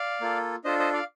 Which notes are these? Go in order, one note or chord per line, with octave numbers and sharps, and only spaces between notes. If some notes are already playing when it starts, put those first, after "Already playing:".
Already playing: D5 F5
A#3 F4 A4
D4 F4 A4 C5 D#5
C5 D#5
D5 F5